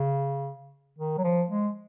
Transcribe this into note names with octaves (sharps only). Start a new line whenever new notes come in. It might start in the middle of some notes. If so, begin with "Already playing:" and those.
Already playing: C#3
D#3
F#3
F3
G#3